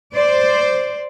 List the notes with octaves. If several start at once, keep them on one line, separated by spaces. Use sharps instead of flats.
C5 D5